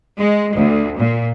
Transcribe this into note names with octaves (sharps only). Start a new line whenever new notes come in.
G#3
D2
A#2